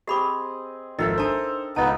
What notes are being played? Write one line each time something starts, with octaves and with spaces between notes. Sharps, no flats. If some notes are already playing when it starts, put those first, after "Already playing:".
C4 G4 G#4 D#5 B5 D6
G#1 F3 A4 A#4 D#5 E5
D4 D#4 C5 A5
C#2 C#3 B3 D#4 F4 D#5 A5